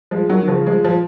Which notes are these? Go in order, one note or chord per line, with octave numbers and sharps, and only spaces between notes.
F3 G#3
D#3 F#3
D#3
C#3 F3
F3 G#3
F3